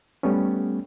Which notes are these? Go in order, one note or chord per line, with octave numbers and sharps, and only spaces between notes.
G3 A3 B3 C#4